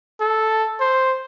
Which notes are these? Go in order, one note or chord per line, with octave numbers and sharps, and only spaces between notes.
A4
C5